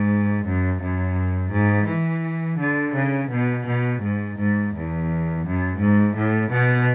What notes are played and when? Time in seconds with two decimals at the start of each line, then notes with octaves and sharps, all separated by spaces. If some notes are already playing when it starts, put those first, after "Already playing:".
Already playing: G#2
0.44 F#2
0.80 F#2
1.51 G#2
1.87 E3
2.58 D3
2.94 C#3
3.29 B2
3.64 B2
4.01 G#2
4.37 G#2
4.72 E2
5.43 F#2
5.79 G#2
6.15 A2
6.49 B2